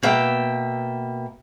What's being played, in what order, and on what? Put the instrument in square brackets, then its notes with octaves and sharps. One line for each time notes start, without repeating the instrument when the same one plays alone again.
[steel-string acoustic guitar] B2 A#3 E5 G5